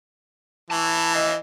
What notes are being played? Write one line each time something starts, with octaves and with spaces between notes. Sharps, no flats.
E3 A5 B5
D#5 F5